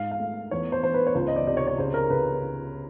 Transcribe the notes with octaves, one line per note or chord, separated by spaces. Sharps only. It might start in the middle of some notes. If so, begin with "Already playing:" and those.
Already playing: G#2 F5
F5
A3
E2 C#5
C5
E2 C5
B4
C#5
C#2 C5
D#5
D5
C3 D5
C#5
C#5
C#3 C5
A#4
C#3 B4